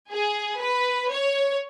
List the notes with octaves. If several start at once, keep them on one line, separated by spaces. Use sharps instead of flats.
G#4
B4
C#5